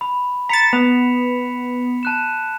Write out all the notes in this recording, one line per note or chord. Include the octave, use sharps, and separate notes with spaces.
B5
A#5 A6 B6 C#7 E7
B3 F7
A5 F#6 E7